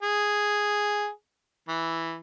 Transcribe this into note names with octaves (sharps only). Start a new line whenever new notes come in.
G#4
E3